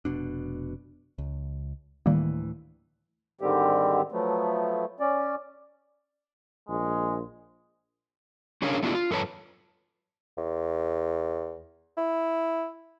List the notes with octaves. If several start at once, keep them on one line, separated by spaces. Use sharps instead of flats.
F1 B2 D4
C#2
D2 A2 D#3 E3 G3 A#3
G#2 D3 D#3 G3 C4 G4
F3 F#3 A3 B3
C#4 D5
A#1 G#3
C#4 D4 G#4 A#4 C#5 F5
A3 B3 D4 E4 F4 G4
F4
F#2 A4 B4 C#5 A5
E2
E4